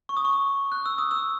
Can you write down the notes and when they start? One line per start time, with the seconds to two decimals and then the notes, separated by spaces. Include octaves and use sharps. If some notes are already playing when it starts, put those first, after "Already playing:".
0.09 C#6
0.17 D#6
0.25 C#6
0.72 F#6
0.86 E6
0.98 D#6
1.11 E6